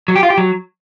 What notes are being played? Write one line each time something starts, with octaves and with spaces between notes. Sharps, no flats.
F#3
G4
F4
G4
F#3